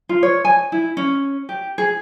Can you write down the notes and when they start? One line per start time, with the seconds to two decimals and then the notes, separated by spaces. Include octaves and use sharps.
0.09 F4
0.23 C#5
0.45 G#5
0.72 E4
0.97 C#4
1.49 G4
1.78 G#4